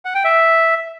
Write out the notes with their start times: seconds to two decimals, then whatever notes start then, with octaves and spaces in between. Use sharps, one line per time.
0.05 F#5
0.15 G5
0.24 E5